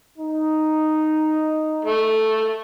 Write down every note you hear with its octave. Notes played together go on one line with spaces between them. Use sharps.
D#4
A3